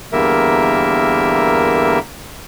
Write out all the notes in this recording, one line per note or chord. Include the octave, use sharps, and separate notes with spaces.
E2 D3 G3 A#3 A#4 E5